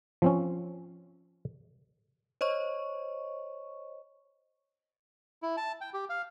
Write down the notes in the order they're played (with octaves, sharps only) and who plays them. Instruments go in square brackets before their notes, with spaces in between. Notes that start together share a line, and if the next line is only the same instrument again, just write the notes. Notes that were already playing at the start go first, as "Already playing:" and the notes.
[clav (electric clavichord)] F3 C4 C#4
[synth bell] C5 C#5 D#5 C#6
[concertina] E4
A5
G5
G4
F5